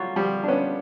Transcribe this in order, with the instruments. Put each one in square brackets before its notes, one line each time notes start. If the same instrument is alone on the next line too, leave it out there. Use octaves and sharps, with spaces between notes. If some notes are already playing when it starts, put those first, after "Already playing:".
Already playing: [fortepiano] F#3 G3 [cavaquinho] F4 C#5
[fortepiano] F3 G3
D4
B3 C#4